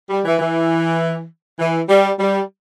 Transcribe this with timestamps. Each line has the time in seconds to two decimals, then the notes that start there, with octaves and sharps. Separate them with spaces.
0.09 G3
0.24 E3
0.39 E3
1.59 E3
1.89 G3
2.19 G3